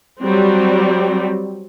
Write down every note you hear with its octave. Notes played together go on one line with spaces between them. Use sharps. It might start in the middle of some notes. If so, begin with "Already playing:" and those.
F#3 G3 C4